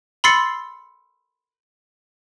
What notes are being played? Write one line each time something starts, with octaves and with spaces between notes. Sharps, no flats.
B5 C6 E6 A6 C7 C#7